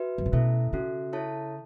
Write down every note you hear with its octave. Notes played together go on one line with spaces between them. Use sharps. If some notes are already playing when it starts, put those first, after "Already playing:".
Already playing: F#4 B4 E5
F#2
A2
B2 A3 C#4 E4 A4 E5
C#3 C#4 F#4 A4 E5
E4 A4 C#5 E5 A5